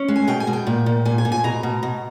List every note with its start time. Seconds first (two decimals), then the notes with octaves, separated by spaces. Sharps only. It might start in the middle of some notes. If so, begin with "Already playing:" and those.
Already playing: C#4
0.08 G#3
0.16 G#5
0.27 B2 G5
0.40 G#5
0.47 B2
0.53 G5
0.67 A#2
0.86 A#2
1.05 A#2 G#5
1.18 G#5
1.25 A#2
1.32 G#5
1.44 B2 A#5
1.63 B2
1.83 B2